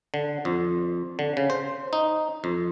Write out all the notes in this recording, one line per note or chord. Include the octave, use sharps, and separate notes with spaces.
D3
F2
D3
C#3
C5
D#4
F2